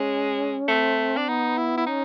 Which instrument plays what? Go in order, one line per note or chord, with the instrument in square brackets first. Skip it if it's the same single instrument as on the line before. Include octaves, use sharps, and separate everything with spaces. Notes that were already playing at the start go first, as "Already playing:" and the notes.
Already playing: [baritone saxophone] G#3 [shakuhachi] C#4
[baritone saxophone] A3 [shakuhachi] C4
[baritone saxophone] D4
[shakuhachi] B3 [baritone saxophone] D#4
[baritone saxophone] E4
E4
[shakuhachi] C#4 [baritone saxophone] D#4